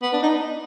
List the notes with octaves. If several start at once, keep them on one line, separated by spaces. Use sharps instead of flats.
B3
D4
D#4